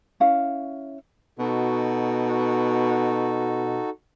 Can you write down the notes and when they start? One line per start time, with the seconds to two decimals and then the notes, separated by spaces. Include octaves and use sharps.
0.20 C#4 E4 F5
1.39 B2 D#4 F#4 A4